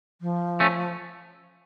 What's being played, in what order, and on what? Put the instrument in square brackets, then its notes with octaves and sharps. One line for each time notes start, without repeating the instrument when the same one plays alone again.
[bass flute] F3
[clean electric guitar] A3 C#4